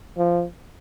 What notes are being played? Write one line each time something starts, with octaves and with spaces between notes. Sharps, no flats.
F3